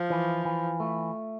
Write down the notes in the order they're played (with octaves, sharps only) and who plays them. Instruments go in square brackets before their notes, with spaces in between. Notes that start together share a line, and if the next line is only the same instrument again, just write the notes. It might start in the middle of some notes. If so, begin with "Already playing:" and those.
Already playing: [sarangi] F3
[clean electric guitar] E3
E3
A3